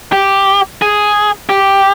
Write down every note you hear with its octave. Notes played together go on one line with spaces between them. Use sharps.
G4
G#4
G4